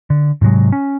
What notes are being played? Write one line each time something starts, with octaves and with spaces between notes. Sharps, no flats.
D3
G#2 C3 F#3 G#3
C#4